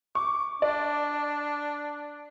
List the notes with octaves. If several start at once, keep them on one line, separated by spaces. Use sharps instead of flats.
C#6 D6
D4 D5